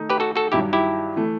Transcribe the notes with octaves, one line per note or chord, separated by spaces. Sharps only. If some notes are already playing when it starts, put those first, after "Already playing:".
Already playing: D#3 A3 D#4
G4 B4
F#4 A4
F#4 A4
G2 D#3 F#3 E4 G4
E4 G4
E3 A3